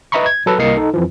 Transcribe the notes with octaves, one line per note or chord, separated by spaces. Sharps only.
B4 D#5 E5 A#5 B5 C#6
G#6
F#3 A4 B4
C2 A#3 A#4 D#5 C7 C#7
D#4 A4
F2 E3 F3